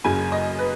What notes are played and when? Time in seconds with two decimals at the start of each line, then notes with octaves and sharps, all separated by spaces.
0.04 F#1 F#2 C#3 G#5
0.32 D#5
0.59 B4